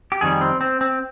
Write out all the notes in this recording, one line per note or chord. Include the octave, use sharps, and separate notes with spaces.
G4
F2 D#3 G3 G#4
C4
C4
C4